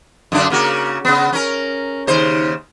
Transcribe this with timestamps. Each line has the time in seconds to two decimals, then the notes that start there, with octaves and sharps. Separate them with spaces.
0.32 F#2 D3 D4
0.50 C#3 A#3 F#4
1.05 C#3 B3
1.33 C#4 A#4
2.07 D#2 C#3 C5